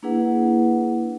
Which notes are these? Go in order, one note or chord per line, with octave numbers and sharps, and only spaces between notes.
A#3 D4 E4 G#4 B4 F#5